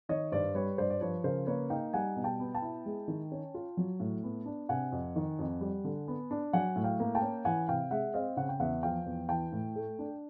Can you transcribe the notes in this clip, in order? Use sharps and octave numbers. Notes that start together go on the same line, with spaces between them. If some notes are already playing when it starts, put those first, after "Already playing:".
D#3 C#5 D#5
G2 C5 D5
G3 B4 C#5
G2 C5 D5
D5
F3 B4 C#5
C#3 A#4 C5
A#3 B4 C#5
D#4 F5 G5
G3 F#5 G#5
B2
G5 A5
B3
G5 A5
E4
G#3
D#3
C#4
F4
F#3
A2
B3
D4
C3 F#5 G#5
F2
D#3
F2
G3
D3
B3
D4
F#3 F#5 G#5
A2
F5 G5
A#3
G5 A5
C#4
E3 F#5 G#5
C3 F5 G5
G#3 E5 F#5
C4 D#5 F5
C#3 F#5
G5
E2 E5 F#5
F3 F5 G5
E2
E3 G5 A5
A2
A3
D4